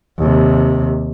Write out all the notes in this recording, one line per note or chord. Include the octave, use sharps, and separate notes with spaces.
D#2 C3